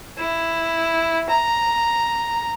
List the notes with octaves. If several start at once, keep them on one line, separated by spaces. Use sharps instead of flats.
E4
A#5